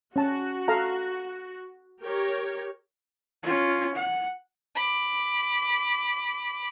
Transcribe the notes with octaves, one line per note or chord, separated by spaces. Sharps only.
C#4 F#4 A5
A4 F5 A#5
G4 A#4 C#5
C#4 F4
F#5
B5 D6